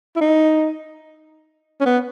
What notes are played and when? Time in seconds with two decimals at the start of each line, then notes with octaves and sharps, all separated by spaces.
0.16 E4
0.21 D#4
1.81 C#4
1.86 B3